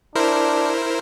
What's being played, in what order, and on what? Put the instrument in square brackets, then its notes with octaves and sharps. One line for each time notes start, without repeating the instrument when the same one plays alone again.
[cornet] D4 [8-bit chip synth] E4 A#4 C5